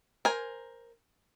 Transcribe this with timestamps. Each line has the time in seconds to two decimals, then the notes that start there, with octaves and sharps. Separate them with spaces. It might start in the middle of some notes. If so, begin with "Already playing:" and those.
0.25 A#4 C5 G#5